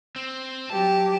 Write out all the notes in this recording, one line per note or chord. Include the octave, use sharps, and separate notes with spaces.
C4
F#3 G4 A5